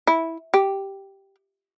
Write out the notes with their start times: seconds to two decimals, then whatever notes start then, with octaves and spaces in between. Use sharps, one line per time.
0.07 E4
0.54 G4